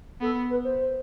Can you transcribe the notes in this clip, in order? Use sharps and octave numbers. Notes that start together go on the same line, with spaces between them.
B3 A4
B4
C5